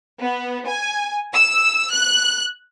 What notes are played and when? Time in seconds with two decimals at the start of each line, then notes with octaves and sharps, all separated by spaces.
0.20 B3
0.66 G#5
1.35 E6
1.91 F#6